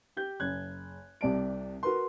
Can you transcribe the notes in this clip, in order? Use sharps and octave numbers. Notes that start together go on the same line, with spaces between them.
G4 G6
F#1 F#6 G#6
C2 C3 D5 A5 D7
F#4 A#4 B4 C6